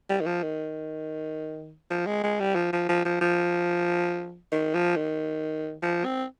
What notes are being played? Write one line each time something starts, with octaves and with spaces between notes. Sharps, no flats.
G3
D#3
F3
D#3
F3
G#3
G#3
G3
F3
F3
F3
F3
F3
D#3
F3
D#3
F3
C4